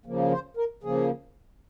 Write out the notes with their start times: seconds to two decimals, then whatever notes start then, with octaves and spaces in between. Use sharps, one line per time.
0.06 C#3 F3 A#3
0.32 C5
0.57 A#4
0.83 C#3 F3 A#3 G#4